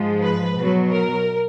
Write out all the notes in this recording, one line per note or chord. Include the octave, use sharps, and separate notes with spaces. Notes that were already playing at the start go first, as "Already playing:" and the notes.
Already playing: G#2 F3 G#3
B4
B2 F#3
A#4